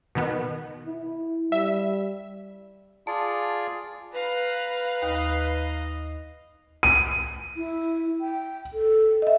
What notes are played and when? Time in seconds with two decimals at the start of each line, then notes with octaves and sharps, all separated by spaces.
0.15 B2 D#3 B3
0.86 E4
1.52 G3 E5
3.07 F4 G#4 D5 A5
4.14 B4 F5 A#5
5.02 D#2 D#5
6.83 D#7
7.56 E4
8.21 G5
8.74 A4
9.22 D#5 E5